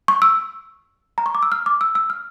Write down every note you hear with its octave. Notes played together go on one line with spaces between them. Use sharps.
C#6
E6
A#5
C#6
D6
E6
F6
D6
E6
E6
F6